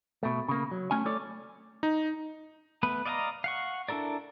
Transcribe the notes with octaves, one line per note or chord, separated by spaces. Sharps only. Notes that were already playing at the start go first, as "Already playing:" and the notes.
B2 A3
C#3 A#3
F#3
A3 C#4 G#5
A3 E4 A4 C#5 D5
D#4
A3 B3 B4
D5 D#5 F5 G#5 A#5
F5 F#5 C#6
D4 E4 A4 A#4 D5